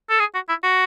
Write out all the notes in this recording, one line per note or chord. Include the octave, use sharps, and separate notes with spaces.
A4
G#4
F#4
E4
F#4